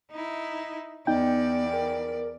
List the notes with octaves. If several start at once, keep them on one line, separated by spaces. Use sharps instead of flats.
D#4 E4
E2 B3 D#4 D5 G5
A#4